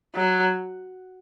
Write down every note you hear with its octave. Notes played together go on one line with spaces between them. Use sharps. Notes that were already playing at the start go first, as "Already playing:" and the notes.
F#3